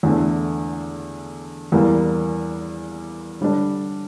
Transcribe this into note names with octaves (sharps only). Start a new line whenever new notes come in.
E2 D3 A3
E2 E3 G3 A#3
D3 G3 D4